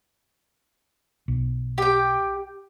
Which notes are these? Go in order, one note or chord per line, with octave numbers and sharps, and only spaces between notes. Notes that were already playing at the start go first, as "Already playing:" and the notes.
B1
G4 G5